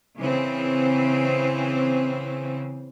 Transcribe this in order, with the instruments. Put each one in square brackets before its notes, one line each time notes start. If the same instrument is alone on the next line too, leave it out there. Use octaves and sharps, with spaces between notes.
[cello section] C#3 E3 C4